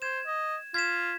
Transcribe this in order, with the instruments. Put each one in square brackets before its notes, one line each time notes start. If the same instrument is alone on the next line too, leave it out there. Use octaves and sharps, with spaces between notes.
[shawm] C5 [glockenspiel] G#6 E7
[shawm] D#5
[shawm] F4 [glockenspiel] G#6 B6 E7